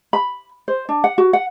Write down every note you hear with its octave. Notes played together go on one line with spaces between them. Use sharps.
B5
C5
D4
F#5
F#4
F#5